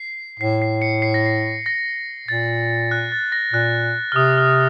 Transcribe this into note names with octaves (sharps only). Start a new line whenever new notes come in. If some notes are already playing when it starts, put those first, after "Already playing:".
Already playing: C7
A2 C7
C7
C#7
C7
A#6
C7
A#6
A#2 A6
F#6
A6
A#6
A#2 F#6
F6
C3 D#6
F6